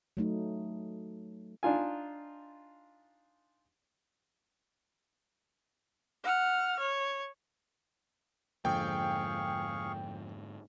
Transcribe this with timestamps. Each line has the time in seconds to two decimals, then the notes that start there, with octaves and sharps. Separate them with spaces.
0.17 F#3 A3 D#4
1.63 D4 D#4 F4 G#5
6.23 F#5 F6
6.79 C#5
8.65 F2 G#2 D3 A#3 G#4 F5 G5 C#6